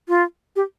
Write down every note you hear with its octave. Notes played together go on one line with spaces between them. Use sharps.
F4
G4